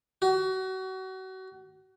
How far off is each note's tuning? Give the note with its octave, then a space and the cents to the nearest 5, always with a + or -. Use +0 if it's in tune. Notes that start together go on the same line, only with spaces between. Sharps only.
F#4 +30